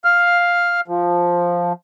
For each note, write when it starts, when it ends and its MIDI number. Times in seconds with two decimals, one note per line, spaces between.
0.05 0.80 77
0.05 0.80 89
0.88 1.73 53